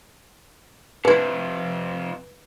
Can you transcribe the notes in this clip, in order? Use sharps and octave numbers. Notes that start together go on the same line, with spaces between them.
F2 C3 D4 E4 B4